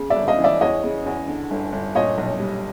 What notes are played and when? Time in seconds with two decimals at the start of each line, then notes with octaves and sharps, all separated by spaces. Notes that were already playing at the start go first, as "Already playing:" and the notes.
Already playing: C#3
0.10 D5 E5
0.16 G1
0.28 D#5 F5
0.38 E3
0.44 D5 E5
0.61 E2 C#5 D#5
0.83 C#3
1.06 E2
1.28 D3
1.51 G1
1.72 G1
1.95 A#2 C#5 D#5
2.18 B1
2.40 G3